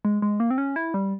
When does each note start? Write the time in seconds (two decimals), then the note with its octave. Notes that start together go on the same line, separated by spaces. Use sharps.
0.05 G#3
0.22 G#3
0.40 A#3
0.50 C4
0.58 C#4
0.76 E4
0.94 G3